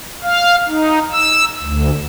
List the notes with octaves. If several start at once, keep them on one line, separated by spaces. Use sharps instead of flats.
F5
D#4
E6
D2